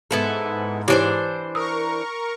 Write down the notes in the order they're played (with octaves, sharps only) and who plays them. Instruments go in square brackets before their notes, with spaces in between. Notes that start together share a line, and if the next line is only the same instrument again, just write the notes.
[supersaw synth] G#2 [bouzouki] B3 E4 A4
[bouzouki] E3 D4 C5 [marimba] E4 G4 C#5
[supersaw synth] A#4 C#6 [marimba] D#6 E6